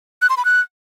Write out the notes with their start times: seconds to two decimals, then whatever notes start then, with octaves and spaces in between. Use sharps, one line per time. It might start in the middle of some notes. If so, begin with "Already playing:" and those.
0.22 F#6
0.30 C6
0.37 B5
0.45 F#6